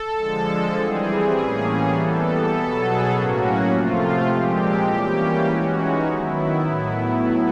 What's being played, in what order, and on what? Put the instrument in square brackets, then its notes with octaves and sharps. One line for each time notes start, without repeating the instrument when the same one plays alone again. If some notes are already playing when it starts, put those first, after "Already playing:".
Already playing: [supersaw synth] A4
D3 F3 G#3
E3 G3 C4 G#4
A2 E3 G3 A#3 C#4
E3 G3 B3 A4
B2 F#3 B3 A4
G#4
A2 F#3 A#3 C#4 F#4
C3 F3 A3 F4
A#2 F3 G#3 C4 G4
E3 G3 A#3 C#4 G4
E3 G#3 C#4 F#4
D#4
D#3 F#3 B3 E4
A2 F#3 B3 E4